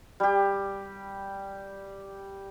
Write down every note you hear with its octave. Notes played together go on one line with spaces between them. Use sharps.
G3 G4